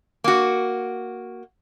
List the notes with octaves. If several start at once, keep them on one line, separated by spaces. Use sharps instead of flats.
A#3 F#4